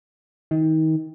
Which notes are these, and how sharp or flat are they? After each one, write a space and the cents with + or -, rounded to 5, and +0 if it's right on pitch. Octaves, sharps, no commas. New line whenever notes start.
D#3 +30